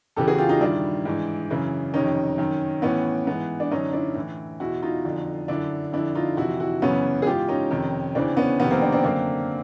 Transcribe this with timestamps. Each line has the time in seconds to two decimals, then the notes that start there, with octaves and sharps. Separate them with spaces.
0.16 E2 C#3 E3 G4 A4
0.28 F#4 G#4
0.38 F4 G4
0.49 D#4 F4
0.61 G2 D#3 D4 E4
1.05 G#2 E3
1.50 F#2 C#3 E3
1.94 F2 C3 D#3 C#4 D#4
2.38 F#2 D#3
2.82 A2 E3 B3 C#4
3.27 G#2 E3 B3
3.60 D4
3.71 F#2 D3 C#4 D#4
3.93 D4 E4
4.15 A2 E3
4.60 E2 B2 E4 F#4
4.82 D#4 F4
5.05 F2 D3
5.48 F#2 D3 D4 E4
5.93 F2 D3 D4 E4
6.15 D#4 F4
6.37 F2 C3 E3 E4 F#4
6.60 E4 F#4
6.82 F#2 C#3 E3 B3 C#4
7.22 G#4
7.26 G#2 E3 F4 G4
7.48 C#4 D#4
7.70 F2 C3 D#3
8.15 E2 C#3 E3 C4 D4
8.37 B3 C#4
8.59 F2 C3 D#3 B3
8.70 A#3 C4
8.81 C4 D4
8.92 C4 D4
9.04 F#2 D3 A#3 C4